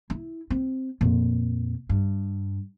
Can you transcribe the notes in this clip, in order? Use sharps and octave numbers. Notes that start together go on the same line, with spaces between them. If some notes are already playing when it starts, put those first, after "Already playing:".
E4
C4
F2 A#2
G2